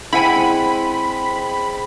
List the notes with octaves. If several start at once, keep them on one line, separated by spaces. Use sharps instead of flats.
G#3 C4 E4 F#5 G#5 B5